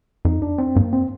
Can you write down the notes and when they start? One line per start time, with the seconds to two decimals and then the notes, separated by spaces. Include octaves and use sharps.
0.25 F2 D#4
0.42 D4
0.58 C4
0.75 G2 A#3
0.93 C4